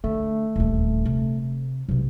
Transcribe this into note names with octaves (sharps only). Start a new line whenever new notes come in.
D3 A3
D#1 D2
C3
B1 C3 B3